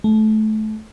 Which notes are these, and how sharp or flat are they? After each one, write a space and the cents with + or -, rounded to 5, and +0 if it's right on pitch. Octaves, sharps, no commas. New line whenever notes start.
A3 -25